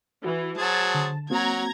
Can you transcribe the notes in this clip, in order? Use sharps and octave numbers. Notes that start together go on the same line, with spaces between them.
E3 F#4
F#3 G#4 C5 A5
D3
F#3 A#3 C4 F#4 A#5 G#6